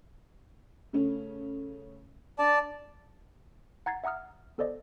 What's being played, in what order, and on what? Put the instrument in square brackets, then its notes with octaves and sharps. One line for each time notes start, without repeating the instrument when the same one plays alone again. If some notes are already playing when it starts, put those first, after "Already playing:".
[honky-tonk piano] C#3 A3 C#4
[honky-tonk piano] D4 [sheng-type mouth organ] D5 A5
[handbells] F#5 A#5 G#6 A6 C7
E5 F#5 A#5 D#6 F6
B3 A4 C5 D5 D#5